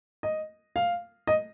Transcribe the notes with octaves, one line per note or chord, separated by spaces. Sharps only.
D#5
F5
D#5